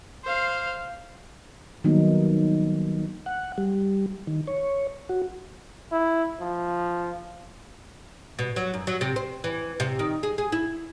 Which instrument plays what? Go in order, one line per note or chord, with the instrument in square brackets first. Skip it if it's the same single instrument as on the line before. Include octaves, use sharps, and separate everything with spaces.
[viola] C5 F5
[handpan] D#3 F#3 G3 A#3 B3 D#4
[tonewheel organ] F#5
G3
D#3
C#5
F#4
[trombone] E4
F3
[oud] B2
F#3
F#2
F#3
C3
C5
E3
C3
D#3
G#4
G#4
E4